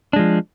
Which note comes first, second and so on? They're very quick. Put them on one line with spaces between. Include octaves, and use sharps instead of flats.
D4 G#3 F3